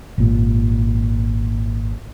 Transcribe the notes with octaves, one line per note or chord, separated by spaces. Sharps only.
G#1 A#2